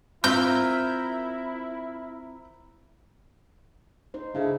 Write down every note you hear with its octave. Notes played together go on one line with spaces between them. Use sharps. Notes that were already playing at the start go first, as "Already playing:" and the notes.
C4 E4 F4 A#4 E5 G6
D#4 C5
C#3 D4 E4 A4